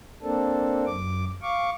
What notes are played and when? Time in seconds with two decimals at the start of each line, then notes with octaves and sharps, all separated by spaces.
0.22 A#3 C4 D4 A4
0.86 F#2 D6
1.42 F5 C#6 D6